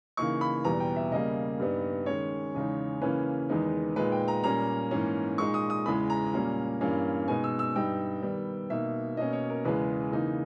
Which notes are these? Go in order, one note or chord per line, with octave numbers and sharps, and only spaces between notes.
C#3 E3 A#3 D#4 C#6
B5
E2 B2 G3 B3 A#5
G5
E5
C#3 G3 A#3 D#5
G2 G3 B3 D#4
D#3 G#3 C#4 C#5
E2 C#3 G#3 D#4
C#3 E3 A#3 C#4 B4
E2 D#3 G#3 B3 D#4
A#2 G#3 D#4 B4
G5
A#5
A#2 G3 A#3 C#4 A#5
G#2 E3 A#3 C#4
A#2 G#3 D#4 C#6
D#6
D#6
E2 C#3 E3 G#3 B5
A#5
A#2 G3 A#3 C#4
G2 E3 A#3 C#4
B2 G#3 B3 D#4 G#5
E6
E6
G2 G3 B3 D#4 G5
D#3 G3 B3
B2 A#3 D#4 E5
B2 A#3 C#4 D#5
C#5
A#4
E2 C#3 E3 G#3 B4
C#3 E3 A#3 D#4